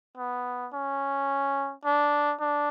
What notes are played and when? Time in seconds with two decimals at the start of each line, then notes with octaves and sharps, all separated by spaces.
0.18 B3
0.73 C#4
1.85 D4
2.40 D4